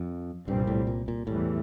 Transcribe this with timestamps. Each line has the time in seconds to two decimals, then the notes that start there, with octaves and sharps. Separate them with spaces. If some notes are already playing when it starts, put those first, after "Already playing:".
Already playing: F2
0.47 C2 G2 A#2 G3 C4
0.67 A2
0.87 A#2
1.08 A#2
1.27 E2 A2 E3 G3